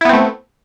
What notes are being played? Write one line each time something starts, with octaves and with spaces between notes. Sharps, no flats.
A3 B3 C4 E4